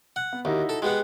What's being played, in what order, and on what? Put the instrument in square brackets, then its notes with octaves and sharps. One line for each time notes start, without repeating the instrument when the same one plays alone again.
[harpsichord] F#5
[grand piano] B3
[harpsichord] D#2 [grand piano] D#4 E4 F#4
[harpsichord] A4
[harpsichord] G#3 B3 F#5 [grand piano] G4 G#4